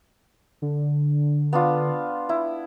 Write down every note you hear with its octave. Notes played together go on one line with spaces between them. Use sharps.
D3
B3 D4 F4
E4